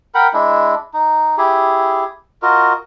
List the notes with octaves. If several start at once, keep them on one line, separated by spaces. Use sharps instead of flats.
A#4 F#5 G5 B5
G#3 D4 E4
D#4
E4 G4 G#4
F4 F#4 A#4 D#5